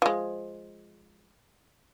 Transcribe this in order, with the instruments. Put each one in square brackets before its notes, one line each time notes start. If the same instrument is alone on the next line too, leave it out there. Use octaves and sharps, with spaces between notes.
[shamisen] F3 G#3